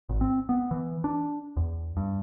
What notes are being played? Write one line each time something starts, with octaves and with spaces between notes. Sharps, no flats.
G#1
C4
B3
E3
D4
E2
G2